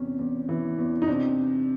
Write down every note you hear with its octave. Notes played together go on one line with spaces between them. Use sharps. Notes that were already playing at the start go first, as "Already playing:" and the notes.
Already playing: E2 C3 C#4
E2
E3
E2
D#4
C3 C4 D4